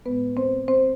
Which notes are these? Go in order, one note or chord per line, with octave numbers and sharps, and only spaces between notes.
A2 G#3 B3 B4
C4 C5
C4 C5